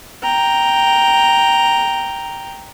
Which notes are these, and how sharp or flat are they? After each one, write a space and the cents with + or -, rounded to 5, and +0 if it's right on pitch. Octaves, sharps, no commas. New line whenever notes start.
G5 +0 A#5 +0